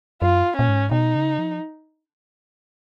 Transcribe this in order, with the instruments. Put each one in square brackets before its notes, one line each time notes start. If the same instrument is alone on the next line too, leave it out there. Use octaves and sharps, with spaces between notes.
[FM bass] F#2 [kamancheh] F4
[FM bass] A#2 [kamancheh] C#4
[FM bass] G#2
[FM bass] B2 [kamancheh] D#4
[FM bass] C#3
F3